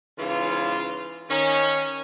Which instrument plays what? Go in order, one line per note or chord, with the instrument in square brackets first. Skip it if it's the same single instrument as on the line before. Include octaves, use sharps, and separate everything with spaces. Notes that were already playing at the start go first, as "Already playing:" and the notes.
[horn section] G#2 C#3 E3 F4
D#3 C#4